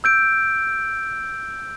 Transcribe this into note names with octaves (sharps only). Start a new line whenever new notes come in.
E6 G6 D7